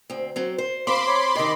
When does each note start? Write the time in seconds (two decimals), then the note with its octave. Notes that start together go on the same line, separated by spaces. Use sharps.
0.10 D2 C4
0.36 F#3 C4
0.58 C5
0.87 C4 C5 F5 B5 C6 D6
1.06 C#5
1.35 C3 D#3 D#5